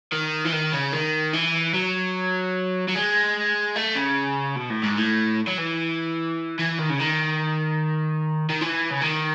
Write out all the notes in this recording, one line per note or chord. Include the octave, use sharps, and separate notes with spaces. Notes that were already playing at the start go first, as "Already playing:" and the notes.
D#3
E3
D#3
C#3
D#3
E3
F#3
F#3
G#3
A3
C#3
B2
A2
G#2
A2
F#3
E3
E3
D#3
C#3
D#3
D#3
E3
C#3
D#3